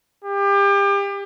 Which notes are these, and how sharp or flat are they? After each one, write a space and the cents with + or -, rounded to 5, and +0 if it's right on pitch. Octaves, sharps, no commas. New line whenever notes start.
G4 +30